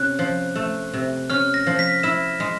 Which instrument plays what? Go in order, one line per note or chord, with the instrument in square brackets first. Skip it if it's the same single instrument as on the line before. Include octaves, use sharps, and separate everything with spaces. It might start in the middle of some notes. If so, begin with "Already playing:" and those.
Already playing: [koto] C3 C#4 [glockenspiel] F#6
[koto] F3
A3
C3
[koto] C#4 [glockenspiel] F6
[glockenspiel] A#6
[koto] F3
[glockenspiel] B6
[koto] E4 [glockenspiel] E7
[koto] G#3